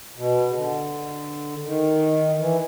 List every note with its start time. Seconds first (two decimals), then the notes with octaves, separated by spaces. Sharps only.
0.18 B2
0.50 C#3
0.55 D3
1.65 D#3
2.40 E3